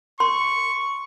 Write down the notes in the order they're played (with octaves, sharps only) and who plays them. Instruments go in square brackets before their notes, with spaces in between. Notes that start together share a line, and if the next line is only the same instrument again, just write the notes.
[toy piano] C6 [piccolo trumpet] C#6